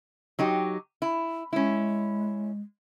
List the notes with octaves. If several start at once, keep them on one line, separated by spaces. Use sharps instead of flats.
F#3 D#4 G4
E4
G#3 C#4 E4